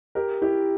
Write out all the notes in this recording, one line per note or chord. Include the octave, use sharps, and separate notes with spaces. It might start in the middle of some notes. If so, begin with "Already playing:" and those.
G4 A#4
E4 G4